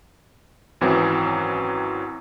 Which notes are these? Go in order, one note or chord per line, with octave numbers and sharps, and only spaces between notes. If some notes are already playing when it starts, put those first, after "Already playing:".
G#1 F#2 E3 F#3 C4